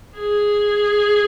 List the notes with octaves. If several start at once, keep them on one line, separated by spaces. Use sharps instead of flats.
G#4